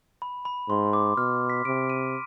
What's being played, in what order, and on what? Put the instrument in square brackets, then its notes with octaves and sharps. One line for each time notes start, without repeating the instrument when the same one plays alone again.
[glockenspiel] B5
B5
[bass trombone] G#2 [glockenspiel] C6
[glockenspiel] D6
[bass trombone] B2 [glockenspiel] F6
[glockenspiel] B6
[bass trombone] C3 [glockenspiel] D7
[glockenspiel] D#7